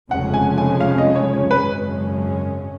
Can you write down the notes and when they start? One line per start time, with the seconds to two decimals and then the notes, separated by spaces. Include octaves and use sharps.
0.11 F1 F2 C#3 G#3 C#4 F#5
0.34 G#5
0.58 G#5
0.80 F5
0.98 D#5
1.16 C#5
1.33 C#5
1.50 G#1 F#2 C#3 G#3 C#4 B4